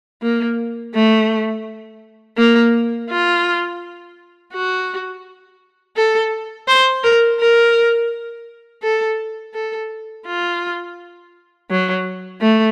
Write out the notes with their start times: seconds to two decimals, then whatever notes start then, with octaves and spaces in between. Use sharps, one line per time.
0.22 A#3
0.94 A3
2.37 A#3
3.10 F4
4.53 F#4
5.96 A4
6.68 C5
7.03 A#4
7.40 A#4
8.83 A4
9.54 A4
10.26 F4
11.70 F#3
12.41 A3